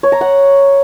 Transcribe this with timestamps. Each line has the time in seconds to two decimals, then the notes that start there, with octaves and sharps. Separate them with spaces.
0.03 C#5
0.12 A#5
0.21 F#5